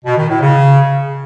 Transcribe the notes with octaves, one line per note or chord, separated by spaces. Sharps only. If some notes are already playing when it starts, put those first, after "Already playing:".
B2
D#3
A2
C#3